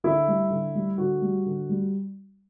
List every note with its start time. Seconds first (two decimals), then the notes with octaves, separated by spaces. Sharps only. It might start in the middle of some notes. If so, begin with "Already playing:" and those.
0.04 D3 E4
0.28 G3
0.50 D3
0.75 G3
0.98 D3 F#4
1.22 G3
1.46 D3
1.69 G3